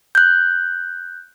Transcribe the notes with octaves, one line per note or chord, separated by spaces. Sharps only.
F#6 G6